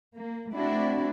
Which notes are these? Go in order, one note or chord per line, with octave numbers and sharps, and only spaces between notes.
A#3
A3 C4 D4 E4 F#4